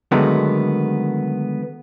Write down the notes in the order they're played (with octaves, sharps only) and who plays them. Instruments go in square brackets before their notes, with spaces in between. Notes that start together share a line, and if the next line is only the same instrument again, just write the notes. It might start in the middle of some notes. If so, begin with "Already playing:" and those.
[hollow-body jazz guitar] D3 D#3 F#3 G#3 A3 B3